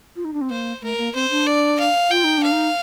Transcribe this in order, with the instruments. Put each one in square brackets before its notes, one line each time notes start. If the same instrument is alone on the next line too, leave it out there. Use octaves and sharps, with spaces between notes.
[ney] F4
D#4
D4
C4
[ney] A#3 [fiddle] C5
[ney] A3 [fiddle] A#4
[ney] A#3
[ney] C4 [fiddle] C5
[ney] D4
[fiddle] D5
F5
[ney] F4 [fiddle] G5
[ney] D#4
D4
[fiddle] F5
[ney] D#4